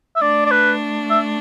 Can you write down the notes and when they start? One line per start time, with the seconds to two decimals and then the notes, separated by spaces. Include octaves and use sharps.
0.16 E5
0.21 A3 D4 D5
0.46 D5
0.51 B4
1.10 E5